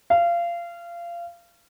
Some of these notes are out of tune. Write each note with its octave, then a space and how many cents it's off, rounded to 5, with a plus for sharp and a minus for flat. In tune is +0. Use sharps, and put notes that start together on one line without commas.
F5 -25